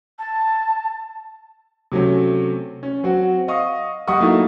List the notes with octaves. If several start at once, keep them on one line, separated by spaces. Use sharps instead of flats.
A5
C3 F#3 A3 C#4
C#4
F#3 C4 F#4
D#5 F5 C#6 D#6
G3 D#5 F#5 C#6 D#6
F#3 A3 A#3 D#4 E4